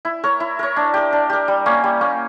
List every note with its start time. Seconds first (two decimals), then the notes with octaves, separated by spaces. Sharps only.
0.05 E4
0.24 A#4 C#5
0.40 E4
0.59 A#4 C#5
0.76 D4
0.94 G4 A#4
1.13 D4
1.30 G4 A#4
1.48 G3
1.66 A#3 C#4
1.84 G3
2.01 A#3 C#4